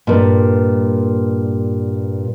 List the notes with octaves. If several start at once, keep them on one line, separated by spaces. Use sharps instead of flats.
G2 A#2